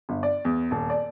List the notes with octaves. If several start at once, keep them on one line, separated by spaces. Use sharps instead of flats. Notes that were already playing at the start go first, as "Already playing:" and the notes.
G1
D5
E2
D#1
D5